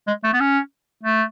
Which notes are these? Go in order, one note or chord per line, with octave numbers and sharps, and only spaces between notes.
G#3
A3
B3
C#4
A3